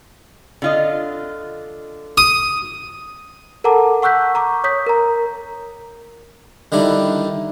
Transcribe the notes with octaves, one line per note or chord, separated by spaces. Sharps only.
D3 F4 D#5
D#6
A4 A#4 F#5 A5 A#5 D6
F#5 C#6 E6 F#6 G6 B6
A#5 C#6 D6
C#5 D#6 G6 B6
A#4 A#5
D3 D#3 G3 D4 E4